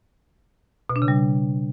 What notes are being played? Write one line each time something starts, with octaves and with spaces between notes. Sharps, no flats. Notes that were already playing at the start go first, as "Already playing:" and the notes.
B2
D4
C#3
G3